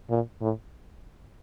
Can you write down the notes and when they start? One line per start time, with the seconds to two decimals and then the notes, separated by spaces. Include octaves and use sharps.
0.10 A#2
0.41 A2